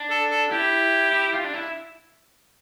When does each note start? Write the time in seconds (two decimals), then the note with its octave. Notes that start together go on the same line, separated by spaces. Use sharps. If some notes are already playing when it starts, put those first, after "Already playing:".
Already playing: D4
0.11 A4
0.30 A4
0.51 E4 G4
1.12 E4
1.34 F4
1.44 D4
1.54 E4